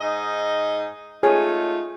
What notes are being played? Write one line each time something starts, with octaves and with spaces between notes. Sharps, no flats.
G#2 D#4 D#5
A3 D#4 F4 G#4 C#5 G#5